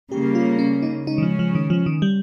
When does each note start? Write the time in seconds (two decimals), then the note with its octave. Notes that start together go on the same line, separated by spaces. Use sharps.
0.11 C#3 G3 A#3 G4
0.35 F4
0.59 C#4
0.82 D#4
1.06 C#3 G#3 C#4 D#4
1.18 D#3
1.23 F3
1.39 F3
1.55 D#3
1.70 F3
1.86 D#3
2.02 G3